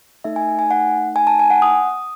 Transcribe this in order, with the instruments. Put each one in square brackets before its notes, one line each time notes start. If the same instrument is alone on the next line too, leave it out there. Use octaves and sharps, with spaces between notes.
[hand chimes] A3 D#4 A4 E5
G#5
G#5
F#5
G#5
A5
G#5
F#5
D#6